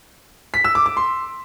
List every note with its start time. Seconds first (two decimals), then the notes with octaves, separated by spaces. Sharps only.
0.54 B6
0.64 E6
0.75 D6
0.86 D6
0.97 C6